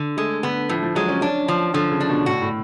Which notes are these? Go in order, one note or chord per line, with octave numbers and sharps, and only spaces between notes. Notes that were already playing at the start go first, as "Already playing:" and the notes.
Already playing: D3
G#3 A3
D3 B3
A2 F3
F3
F#3 G#3
C#4
C#4 D4
F3
D3 F3
C#3
D4
B2
A2 F#4
A2